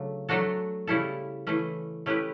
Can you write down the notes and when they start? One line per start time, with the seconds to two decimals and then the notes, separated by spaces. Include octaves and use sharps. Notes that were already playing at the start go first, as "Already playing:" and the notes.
Already playing: C#3 F#3 A3 D4
0.29 F#3 A3 D4 F#4 A4
0.87 C#3 G3 C#4 E4 A4
1.47 E3 A3 C#4
2.06 A3 C#4 E4 G4 B4